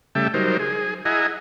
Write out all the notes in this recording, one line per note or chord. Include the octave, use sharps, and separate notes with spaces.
C#3 G3 A3 E5 G5 A5
F#3 G3 D#4 A#4 C5
G#4
E4 G#4 D#5 F#5 G#5 A#5